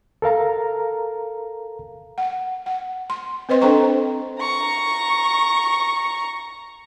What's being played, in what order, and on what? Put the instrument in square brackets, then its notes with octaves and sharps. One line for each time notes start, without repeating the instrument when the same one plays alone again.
[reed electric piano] A4 A#4 F5 A#5
[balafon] F#5
F#5
C6
C4 B4 C5 D#5 C6
D4 A4 C5 G5 A#5 C#6
[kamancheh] A#5 C#6